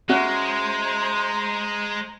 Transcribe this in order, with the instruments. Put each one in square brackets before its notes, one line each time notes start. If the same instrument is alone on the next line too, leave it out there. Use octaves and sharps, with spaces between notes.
[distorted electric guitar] G#3 [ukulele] C#4 F#4 E5 [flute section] C5 A#5